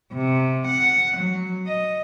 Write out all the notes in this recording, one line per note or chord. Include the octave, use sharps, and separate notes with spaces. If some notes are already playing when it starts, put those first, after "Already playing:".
C3
F#5
F#3
D#5